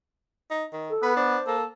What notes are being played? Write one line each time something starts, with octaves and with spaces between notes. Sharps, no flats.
D#4
D#3
A4
B3 B4
D4 C5
A#3 A4